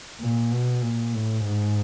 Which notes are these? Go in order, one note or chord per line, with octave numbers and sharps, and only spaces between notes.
A#2
B2
A#2
A2
G#2